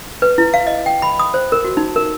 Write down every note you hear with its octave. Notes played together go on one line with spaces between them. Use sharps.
B4
E4
F5
D#5
G5
B5
D#6
C5
A#4
F#4
D#4
A#4